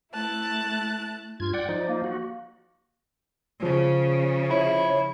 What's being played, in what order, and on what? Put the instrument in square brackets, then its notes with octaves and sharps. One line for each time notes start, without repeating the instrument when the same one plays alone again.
[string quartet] A3 E4 A5 F#6
[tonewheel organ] G2 G#6 [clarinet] F4
[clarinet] D5 [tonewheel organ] F#5 G5
[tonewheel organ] F3 D#4
[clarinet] A#3
[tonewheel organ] F#4
[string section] C#3 [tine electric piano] F3
[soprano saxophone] E4 [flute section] C#5